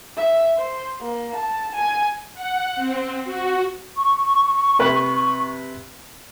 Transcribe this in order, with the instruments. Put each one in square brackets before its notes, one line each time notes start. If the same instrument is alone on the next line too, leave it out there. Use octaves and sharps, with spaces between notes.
[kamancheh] E5
C5
A#3
A5
G#5
[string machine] F#5
C4
F#4
[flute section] C#6
[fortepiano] C3 B4